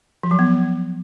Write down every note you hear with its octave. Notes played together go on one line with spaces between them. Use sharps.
F3
F#3
B3